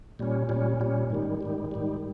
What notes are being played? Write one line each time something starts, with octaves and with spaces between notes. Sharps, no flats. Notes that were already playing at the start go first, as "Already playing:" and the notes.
A#2 G3 C#4
A#2 G3 C#4
A#2 G3 C#4
G#2 D#3 G3
G#2 D#3 G3
G#2 D#3 G3